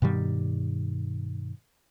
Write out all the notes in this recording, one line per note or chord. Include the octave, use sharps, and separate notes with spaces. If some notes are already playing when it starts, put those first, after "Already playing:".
G2 B2 D#3 G3